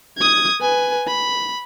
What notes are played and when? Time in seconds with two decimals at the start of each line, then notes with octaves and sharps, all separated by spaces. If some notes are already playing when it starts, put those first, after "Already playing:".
0.18 D#6 G#6
0.61 B4 G#5
1.07 B5